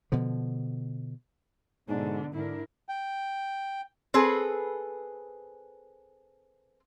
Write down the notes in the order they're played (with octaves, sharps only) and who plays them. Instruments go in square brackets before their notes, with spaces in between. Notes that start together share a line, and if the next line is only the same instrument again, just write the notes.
[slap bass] B2 D3 F3
[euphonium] G#2 [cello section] B2 D3 [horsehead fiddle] D4
[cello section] G#2 D4 A#4 [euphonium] D3 [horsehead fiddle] E4
[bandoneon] G5
[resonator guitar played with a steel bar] C4 G#4 A4 B4